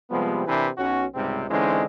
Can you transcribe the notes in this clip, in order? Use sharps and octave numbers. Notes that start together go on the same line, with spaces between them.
C3 F3 G3 G#3 B3
C3 E3 D4 A#4 B4
B1 C#4 F#4
C#2 G#2 C3 G3 C4
D3 E3 G#3 C4 C#4 D#4